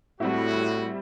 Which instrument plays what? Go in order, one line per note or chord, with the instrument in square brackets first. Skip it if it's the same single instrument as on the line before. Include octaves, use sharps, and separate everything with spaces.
[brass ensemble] A2 F#4 [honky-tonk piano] G3 C4 E4